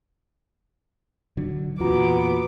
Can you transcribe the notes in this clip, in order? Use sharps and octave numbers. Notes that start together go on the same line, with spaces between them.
D3 F#3
E2 A#2 B3 F4 F#4 A#5 D6